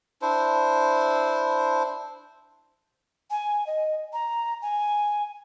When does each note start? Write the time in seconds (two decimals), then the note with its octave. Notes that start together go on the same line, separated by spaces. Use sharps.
0.22 D4 E4 C5
3.31 G#5
3.67 D#5
4.13 A#5
4.62 G#5